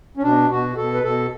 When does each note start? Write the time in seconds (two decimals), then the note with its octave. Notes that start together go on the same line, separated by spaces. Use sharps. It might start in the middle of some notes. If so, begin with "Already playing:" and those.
0.17 C#4
0.23 B2 D4
0.50 B2 F#4
0.76 B2 A4
0.94 B4
1.03 B2 A4